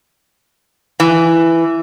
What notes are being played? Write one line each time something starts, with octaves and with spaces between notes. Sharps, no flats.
E3